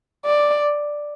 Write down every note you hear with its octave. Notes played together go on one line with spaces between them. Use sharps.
D5